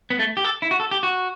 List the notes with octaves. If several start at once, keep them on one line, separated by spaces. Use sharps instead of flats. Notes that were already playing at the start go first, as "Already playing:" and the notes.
B3
A3
G4
A4
E4
F#4
A4
G4
F#4